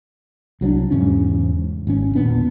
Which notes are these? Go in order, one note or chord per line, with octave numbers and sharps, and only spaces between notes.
C2 F#3 C4 D4
E2 G#2 C#3 C#4
G#1 C#4
E1 A#2 B3 D4